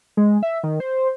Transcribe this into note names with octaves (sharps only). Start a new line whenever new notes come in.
G#3
E5
D#3
C5